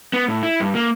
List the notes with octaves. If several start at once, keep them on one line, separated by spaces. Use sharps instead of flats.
B3
A2
E4
G2
A#3